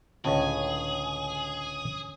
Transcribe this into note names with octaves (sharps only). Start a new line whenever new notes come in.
C#2 A2 D3 C#4 G#4 C#5